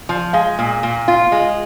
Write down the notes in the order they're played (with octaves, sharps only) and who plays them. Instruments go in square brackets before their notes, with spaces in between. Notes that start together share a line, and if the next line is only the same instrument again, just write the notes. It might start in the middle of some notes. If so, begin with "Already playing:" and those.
[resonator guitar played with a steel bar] F3
[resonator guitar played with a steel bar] G#3 [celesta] F5
[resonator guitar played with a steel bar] A#2
A#2
F4
G#3